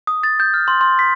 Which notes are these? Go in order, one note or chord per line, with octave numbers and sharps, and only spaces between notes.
D#6
A6
G6
F6
C6
C6
B6